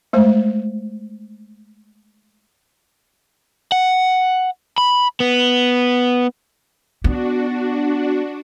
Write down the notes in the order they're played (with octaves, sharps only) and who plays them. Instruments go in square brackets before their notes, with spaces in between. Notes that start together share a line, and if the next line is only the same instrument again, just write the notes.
[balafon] G#3 A3 C5
[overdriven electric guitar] F#5
B5
B3
[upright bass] B3 [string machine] D4 F#4